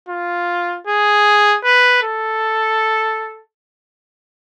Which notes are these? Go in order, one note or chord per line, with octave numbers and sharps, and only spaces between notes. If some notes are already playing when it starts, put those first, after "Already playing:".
F4
G#4
B4
A4